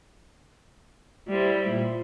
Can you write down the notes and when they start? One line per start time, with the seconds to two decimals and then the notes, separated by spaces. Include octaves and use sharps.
1.29 G3 E4 C5
1.69 A#2